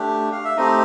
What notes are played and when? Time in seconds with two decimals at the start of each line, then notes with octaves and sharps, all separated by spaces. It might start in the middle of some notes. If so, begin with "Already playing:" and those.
Already playing: A3 D4 G4
0.32 F5
0.45 E5
0.57 A3 C4 D#4 G4 D#5